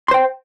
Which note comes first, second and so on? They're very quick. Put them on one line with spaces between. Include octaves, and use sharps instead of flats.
C6 C5 G5